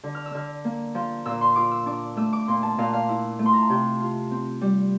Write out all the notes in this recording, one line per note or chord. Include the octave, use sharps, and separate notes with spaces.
D3
F6
E6
D3 F6
A#3
F3
A#2 E6
C6
F4 D6
E6
D4 D6
A3 E6
D6
A#2 C6
A5
A#2 F5
F5
E4
A3
C6
A#5
A5
C3 G5
F4
C4
G3